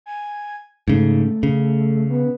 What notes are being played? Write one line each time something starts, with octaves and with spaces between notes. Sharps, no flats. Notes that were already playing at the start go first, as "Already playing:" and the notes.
G#5
G#2 C#3 A3
C#3
B3